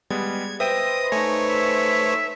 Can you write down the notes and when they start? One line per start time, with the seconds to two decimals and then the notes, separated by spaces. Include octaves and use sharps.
0.10 G3 G#3 B3 G#6
0.60 B4 C5 D#5 E5 G5 D#6 D#7
1.12 A3 D#4 C#5 G#5
1.49 E5